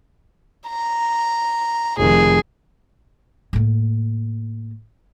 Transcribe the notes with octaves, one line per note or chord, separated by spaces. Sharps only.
A#5
F1 D#3 G#4
A2 A#3